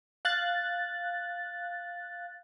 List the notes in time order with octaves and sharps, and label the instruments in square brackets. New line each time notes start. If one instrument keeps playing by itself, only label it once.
[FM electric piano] F5 F#6 A6